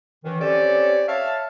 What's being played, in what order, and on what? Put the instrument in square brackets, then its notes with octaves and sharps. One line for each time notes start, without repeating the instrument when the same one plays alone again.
[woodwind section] F#2 D#3 E3
C4 C#4 G4 A4 C#5 D5
C#5 E5 F5 A5